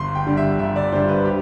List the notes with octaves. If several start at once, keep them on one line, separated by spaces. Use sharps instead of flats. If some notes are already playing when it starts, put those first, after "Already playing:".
Already playing: G1 C6
G5
G2 D3 G3
E5
G1 E5
D5
G2 D3 G3 C5
B4
G4